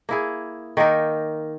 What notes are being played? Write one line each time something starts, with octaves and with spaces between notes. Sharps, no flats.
A#3 E4 G#4
D#3 A#3 D#4 A#4